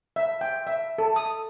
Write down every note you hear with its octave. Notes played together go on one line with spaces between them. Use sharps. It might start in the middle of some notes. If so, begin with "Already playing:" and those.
E5
G5
E5
A4
D#6